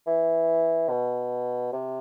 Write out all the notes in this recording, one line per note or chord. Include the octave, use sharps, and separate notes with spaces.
E3
B2
C3